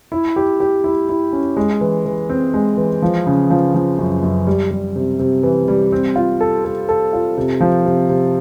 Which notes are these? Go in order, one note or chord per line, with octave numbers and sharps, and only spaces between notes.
E4
G4
G4
E4
E4
C#4
G#3
E3
E3
C4
G#3
E3
F3
C#3
F3
F3
F#2
F#2
G3
G3
C3
C3
E3
G3
C4
F4
A4
A4
A4
F4
C3
F3
C3
C3